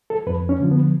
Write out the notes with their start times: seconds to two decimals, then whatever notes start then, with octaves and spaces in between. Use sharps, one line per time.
0.10 A4
0.27 F2 B4
0.49 C#4
0.60 D3 F3
0.71 B3